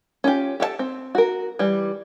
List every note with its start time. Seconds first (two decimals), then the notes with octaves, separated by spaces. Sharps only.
0.24 C#4 F4 G4
0.60 G4 A4 E5 A5
0.79 C4
1.15 F#4 A#4
1.59 E3 G3